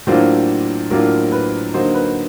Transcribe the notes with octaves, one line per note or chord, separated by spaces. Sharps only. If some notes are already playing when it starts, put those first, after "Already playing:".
A2 F#3 A#3 D4 F4 C5
A2 F#3 A#3 D4 F4 A#4
B4
D3 F#3 A#3 D#4 C5
B4